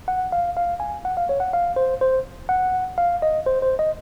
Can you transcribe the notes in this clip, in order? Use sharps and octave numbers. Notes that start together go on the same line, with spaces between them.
F#5
F5
F5
G#5
F#5
F5
C#5
F#5
F5
C5
C5
F#5
F5
D#5
C5
C5
D#5